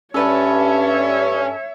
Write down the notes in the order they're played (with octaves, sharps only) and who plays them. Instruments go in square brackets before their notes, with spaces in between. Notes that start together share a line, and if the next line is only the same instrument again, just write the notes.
[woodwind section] G2 [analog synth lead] C#4 [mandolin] A4 B4 A5 [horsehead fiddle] C#5 E5